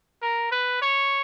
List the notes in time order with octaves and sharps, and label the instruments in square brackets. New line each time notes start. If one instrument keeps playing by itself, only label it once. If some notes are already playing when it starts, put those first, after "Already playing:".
[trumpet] A#4
B4
C#5